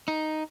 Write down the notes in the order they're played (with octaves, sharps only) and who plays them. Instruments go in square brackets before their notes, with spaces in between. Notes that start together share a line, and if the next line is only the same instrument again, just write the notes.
[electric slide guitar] D#4